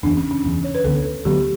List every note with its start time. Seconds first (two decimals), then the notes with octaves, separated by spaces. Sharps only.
0.03 F#1 E2 C#3 D4
0.17 C#4
0.31 C#4
0.44 F#1 E2 C#3
0.64 C#5
0.75 B4
0.84 D2 D3 F#3 B3 A4
1.25 D2 D3 F#3 B3 G4